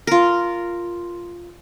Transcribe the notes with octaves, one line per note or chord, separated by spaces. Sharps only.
F4 A#4